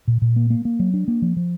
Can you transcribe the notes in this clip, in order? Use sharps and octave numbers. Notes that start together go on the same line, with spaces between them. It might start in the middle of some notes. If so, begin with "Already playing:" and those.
A#2
A#2
A#3
A#3
A#3
F#3
D4
A#3
F3
F3